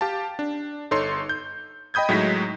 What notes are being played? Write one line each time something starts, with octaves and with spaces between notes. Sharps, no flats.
G4 F5 A5
D4
G1 D#4 A4 C#5 C6
G6
D#5 G5 B5 D#6 G6 G#6
A2 F#3 G#3 D#4 A#6 B6